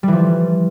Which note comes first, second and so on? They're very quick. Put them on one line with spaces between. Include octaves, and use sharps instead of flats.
G3 E3 F3